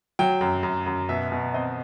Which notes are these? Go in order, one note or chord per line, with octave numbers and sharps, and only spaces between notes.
F#3 G5
F#2
F#2
F#2
B2 E5
B2
C4 D#5